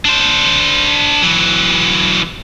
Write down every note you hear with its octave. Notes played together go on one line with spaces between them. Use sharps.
D4 C5
E3 F#3